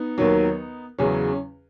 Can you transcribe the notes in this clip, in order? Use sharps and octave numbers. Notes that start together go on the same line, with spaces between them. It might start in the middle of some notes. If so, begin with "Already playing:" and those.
Already playing: B3 D#4
D#2 D#3 F#3
E2 C#3 F#3 C#4